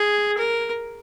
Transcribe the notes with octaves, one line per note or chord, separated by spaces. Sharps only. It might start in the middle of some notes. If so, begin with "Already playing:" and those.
Already playing: G#4
A#4